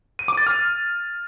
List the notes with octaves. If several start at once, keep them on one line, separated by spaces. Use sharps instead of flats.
D#7
D6
A6
F6